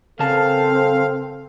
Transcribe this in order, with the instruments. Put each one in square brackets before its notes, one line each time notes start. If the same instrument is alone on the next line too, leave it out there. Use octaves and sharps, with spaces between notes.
[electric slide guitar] C#3 A#4 A5 [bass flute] C4 [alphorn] A4 [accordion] F5